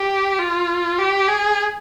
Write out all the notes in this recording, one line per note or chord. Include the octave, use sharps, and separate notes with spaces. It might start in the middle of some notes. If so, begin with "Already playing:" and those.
Already playing: G4
F4
G4
G#4